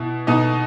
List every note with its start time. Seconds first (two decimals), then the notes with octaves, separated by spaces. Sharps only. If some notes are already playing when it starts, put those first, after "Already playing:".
Already playing: B2 E4
0.27 B2 D#4 D#5